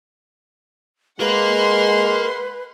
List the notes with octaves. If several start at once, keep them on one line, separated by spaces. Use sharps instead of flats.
G#3 A#4 B4 F5 F#5 C6